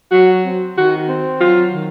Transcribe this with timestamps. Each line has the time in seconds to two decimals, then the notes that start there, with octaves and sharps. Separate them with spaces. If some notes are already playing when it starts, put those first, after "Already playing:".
0.12 F#3 F#4
0.44 C4
0.77 D#3 F#4
1.09 C4
1.40 F#3 F4
1.73 D#3